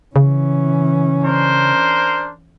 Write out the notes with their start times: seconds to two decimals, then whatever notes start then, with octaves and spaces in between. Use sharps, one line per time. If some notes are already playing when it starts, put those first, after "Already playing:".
0.16 C#3 E3 C#4
1.25 D4 A#4 C5